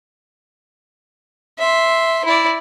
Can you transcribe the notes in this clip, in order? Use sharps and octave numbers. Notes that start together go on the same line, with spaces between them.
E5 C6
E4 D5